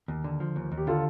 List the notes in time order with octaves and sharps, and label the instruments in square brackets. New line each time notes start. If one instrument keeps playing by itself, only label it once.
[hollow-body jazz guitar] D#2
D3
F3
D#2
D#2
[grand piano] G4
[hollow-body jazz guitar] D3 [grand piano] F4 A4